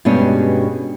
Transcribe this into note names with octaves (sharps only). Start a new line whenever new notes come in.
G2 B2 G3 G#3 C#4